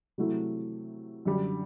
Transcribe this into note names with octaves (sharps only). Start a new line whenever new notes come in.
C3 F#3 A3 E4
F#2 D3 G3 D4